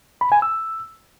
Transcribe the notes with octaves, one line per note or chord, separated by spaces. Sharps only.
B5
G#5
E6